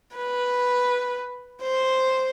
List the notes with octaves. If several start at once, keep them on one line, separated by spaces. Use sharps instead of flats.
B4
C5